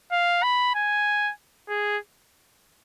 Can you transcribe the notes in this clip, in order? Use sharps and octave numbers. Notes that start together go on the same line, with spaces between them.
F5
B5
G#5
G#4